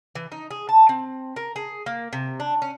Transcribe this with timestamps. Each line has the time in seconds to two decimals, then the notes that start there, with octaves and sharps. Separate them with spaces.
0.15 E3
0.32 D#4
0.51 G#4
0.69 A5
0.89 C4
1.36 A#4
1.56 G#4
1.86 A#3
2.13 C3
2.40 D4
2.62 C#4